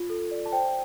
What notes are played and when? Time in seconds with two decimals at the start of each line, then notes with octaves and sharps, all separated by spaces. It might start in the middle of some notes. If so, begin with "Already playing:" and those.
Already playing: F4
0.10 A4
0.31 D5
0.46 A5
0.52 C5 G5